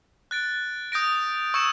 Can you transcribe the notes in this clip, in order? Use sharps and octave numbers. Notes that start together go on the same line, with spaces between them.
F#6 A6 D7
D#6 G6 A#6 D7
C#6 E6 G#6 C#7 E7